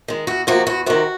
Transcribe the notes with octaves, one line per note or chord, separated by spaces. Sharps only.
D#3 G#3
E2 F#4
C3 F3 A#3 F#4
E2 F#4
C3 D#3 F#4